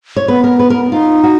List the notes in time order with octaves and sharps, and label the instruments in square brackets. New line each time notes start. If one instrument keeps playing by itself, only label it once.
[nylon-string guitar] C#5
[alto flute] B3 [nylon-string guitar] B4
[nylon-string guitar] A#4
B4
A#4
[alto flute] D#4 [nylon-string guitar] F4
[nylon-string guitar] F#4